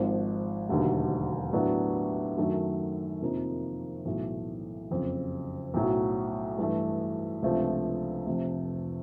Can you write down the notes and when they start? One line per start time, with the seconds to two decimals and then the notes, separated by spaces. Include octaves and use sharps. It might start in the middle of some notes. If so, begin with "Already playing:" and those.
Already playing: G#1 G#2 F3 G#3
0.69 E1 D#2 D3 F#3 A3
1.53 A2 F#3 B3 D4
2.38 F#2 D#3 F#3 A3
3.21 F2 C3 F3 A#3 D#4
4.05 B1 A2 E3 A3
4.91 F#1 F2 C#3
5.74 B1 A2 F#3
6.58 G2 E3 A3
7.42 C#2 C3 F3 A3 D4
8.26 F1 F2 C3 F3 A3